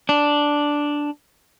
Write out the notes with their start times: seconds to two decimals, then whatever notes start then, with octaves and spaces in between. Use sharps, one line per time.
0.09 D4